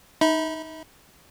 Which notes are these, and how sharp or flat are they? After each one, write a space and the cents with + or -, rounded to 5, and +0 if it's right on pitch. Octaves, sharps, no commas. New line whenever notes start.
D#4 +0 E5 -40 B5 +0